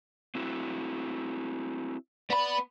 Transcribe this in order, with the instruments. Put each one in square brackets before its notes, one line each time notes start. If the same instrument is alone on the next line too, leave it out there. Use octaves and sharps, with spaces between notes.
[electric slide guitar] C4 E4 F#4
[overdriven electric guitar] B3 B5 [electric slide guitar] D5